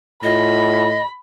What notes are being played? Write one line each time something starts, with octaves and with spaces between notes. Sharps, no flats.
A2 F4 D#5 B5